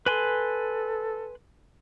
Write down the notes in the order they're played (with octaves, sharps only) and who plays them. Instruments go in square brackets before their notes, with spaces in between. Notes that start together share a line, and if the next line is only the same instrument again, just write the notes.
[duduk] A4 [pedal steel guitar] B4 G#5 C6